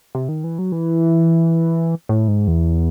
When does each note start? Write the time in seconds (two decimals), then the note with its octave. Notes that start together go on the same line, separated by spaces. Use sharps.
0.15 C3
0.29 D#3
0.44 E3
0.59 F#3
0.72 E3
2.09 A2
2.28 G#2
2.48 E2